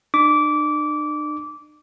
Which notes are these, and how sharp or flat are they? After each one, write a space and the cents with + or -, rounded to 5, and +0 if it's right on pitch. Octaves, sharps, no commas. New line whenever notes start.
D4 +45 D6 -20